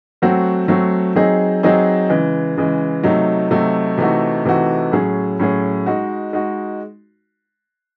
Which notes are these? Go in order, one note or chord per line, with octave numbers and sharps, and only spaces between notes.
F#3 A3 C4 F#4
F#3 A3 C4 F#4
F#3 C4 D#4 G#4 D#5
F#3 C4 D#4 G#4 D#5
C#3 E3 G#3
C#3 E3 G#3
C3 F#3 A3 D#4
C3 F#3 A3 D#4
C3 E3 A3 D#4 F#4
C3 E3 A3 D#4 F#4
A2 F#3 C#4 G#4
A2 F#3 C#4 G#4
G#3 D#4 F#4
G#3 D#4 F#4